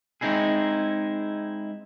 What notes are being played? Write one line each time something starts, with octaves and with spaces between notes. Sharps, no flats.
G#3 C4 D#4 E4 G#4